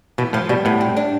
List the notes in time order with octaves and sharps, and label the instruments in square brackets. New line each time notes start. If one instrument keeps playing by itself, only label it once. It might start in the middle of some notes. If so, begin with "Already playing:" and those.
[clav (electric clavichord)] B2 [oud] E3
[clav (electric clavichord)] A2 [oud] F3
[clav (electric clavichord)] B2 [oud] G3
[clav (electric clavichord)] A2 [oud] B3
[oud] C4
D4